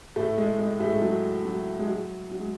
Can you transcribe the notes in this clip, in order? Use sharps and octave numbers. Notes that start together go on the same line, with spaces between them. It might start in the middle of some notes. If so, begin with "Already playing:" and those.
A2 A3
G#3
G#3
A2 A3
G#3
F#3
F#3
G#3
F#3
F#3
G#3